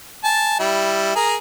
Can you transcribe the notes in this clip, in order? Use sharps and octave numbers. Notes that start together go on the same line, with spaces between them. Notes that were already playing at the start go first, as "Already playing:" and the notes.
G#5 A5
G3 E4
G#4 A#4 A#5